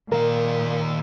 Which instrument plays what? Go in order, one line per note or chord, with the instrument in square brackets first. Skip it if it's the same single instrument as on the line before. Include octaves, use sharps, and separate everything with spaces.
[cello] A#2 [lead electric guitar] D#3 F5 [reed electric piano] A#4